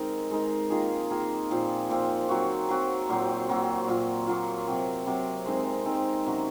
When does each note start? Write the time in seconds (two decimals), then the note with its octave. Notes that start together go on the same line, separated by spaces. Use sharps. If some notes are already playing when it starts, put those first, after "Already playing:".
Already playing: D#3 G#3 C4 D#4 A#4
0.31 G#3 D#4 A#4
0.70 D#3 A#3 F4 G#4
1.10 D#3 A#3 F4 G#4
1.51 A#2 F3 C4
1.90 A#2 F3 C4
2.29 F#3 C4 F#4
2.69 F#3 C4 F#4
3.09 A#2 F#3 C4
3.49 A#2 F#3 C4
3.87 A#2 F#3 A#3 F4
4.27 A#2 F#3 A#3 F4
4.67 C3 F#3 C4
5.07 C3 F#3 C4
5.46 G#3 C4 D#4 A#4
5.85 G#3 C4 D#4 A#4
6.26 C3 F#3 C#4